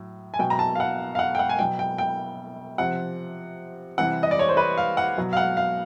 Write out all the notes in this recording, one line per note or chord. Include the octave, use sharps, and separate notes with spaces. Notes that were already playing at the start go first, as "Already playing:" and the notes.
Already playing: A2 F#3
G#5
B2 F#3 G5
A#5
A5
F5
F#5
F5
F#5
G5
F#5
G#5
B2 F#3 G5
G5
G5
C3 F3 F#5
C3 E3 G3 F#5
D#5
D5
C#5
C5
B4
F5
F#5
B2 F#3
F5
F#5
F5